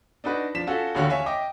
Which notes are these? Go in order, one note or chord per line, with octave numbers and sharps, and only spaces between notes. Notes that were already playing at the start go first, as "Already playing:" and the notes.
D4 D#4 F#4 B4
F3 D4 B6 E7
C#4 F4 F#4 A4
A1 D#2 D3 F#4 C#5 F5
C#5 E5 F5 G#5
D#5 G5 D6